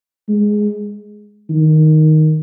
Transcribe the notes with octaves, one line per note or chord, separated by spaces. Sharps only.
G#3
D#3